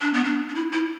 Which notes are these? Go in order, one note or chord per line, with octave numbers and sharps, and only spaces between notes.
D4
B3
D4
D4
E4
E4